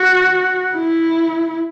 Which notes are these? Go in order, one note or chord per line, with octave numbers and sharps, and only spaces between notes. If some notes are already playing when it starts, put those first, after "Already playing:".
Already playing: F#4
E4